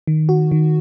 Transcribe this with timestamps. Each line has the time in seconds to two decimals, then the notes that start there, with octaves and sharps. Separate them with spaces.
0.07 D#3
0.29 F#4
0.52 D#3